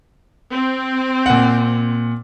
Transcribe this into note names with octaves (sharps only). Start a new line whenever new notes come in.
C4
A#2 F#5